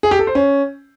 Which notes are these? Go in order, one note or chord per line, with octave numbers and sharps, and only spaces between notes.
G#4
G4
A4
C5
C#4